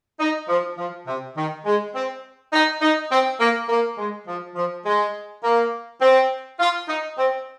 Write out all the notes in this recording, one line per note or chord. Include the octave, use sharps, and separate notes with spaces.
D#4
F3
F3
C3
D#3
G#3
C4
D#4
D#4
C4
A#3
A#3
G#3
F3
F3
G#3
A#3
C4
F4
D#4
C4